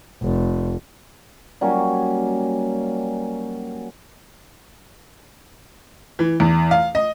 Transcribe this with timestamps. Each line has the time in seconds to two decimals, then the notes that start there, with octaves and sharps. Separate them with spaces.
0.23 F1
1.61 F#3 G3 A#3 C#4
6.19 E3
6.40 E2
6.71 F5
6.95 D#5